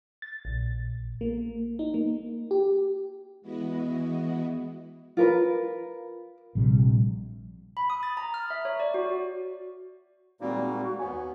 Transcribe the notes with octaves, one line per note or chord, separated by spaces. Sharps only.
A6
A#1
A#3
D#4
A#3
G4
E3 G#3 B3 E4 F#4 D#5
F4 A#4 B4
A#1 C3 G3
B5
D#6
A6
A#5
F6
E5
C#5
D5
F#4
A#2 G3 G#3 A#3 C4 D#4 F#4
D#2 B3 C#5 G#5